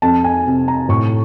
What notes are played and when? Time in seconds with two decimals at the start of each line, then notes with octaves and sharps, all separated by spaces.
0.02 F2 A5
0.24 G#5
0.46 C3
0.68 A#5
0.89 A2 C#6